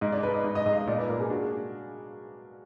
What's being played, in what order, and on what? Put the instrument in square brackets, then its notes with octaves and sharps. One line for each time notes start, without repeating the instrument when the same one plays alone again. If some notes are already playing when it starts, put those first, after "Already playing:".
[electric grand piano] G#2 [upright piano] D#5
[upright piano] D5
[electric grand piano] D#4 [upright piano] B4
[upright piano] D#5
[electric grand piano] G#2 [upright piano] D#5
[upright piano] D#5
[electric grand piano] G#2 [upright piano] D#5
[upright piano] F5
D#5
[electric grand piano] A#2 [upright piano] D5
[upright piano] B4
[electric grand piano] A#2 [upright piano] A#4
[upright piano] G#4
[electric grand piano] D4 [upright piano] F#4